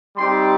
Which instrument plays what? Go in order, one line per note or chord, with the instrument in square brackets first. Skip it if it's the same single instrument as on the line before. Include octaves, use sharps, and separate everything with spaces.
[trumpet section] G3 C4 D#4 G4 C6